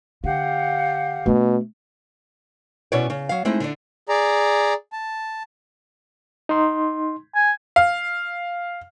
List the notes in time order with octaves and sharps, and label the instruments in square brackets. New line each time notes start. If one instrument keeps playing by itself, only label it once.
[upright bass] D3 [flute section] G4 F5 F#5
[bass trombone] B2 [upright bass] A3 D4
[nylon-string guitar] B2 C#4 E4 F#4 C#5 D5
C#3
F#3 F5
G#3 A3 C4 D#4 E4
D3 D4
[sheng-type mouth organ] G#4 D5 A#5
A5
[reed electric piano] D#4 C6
[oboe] G#5
[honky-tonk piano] F5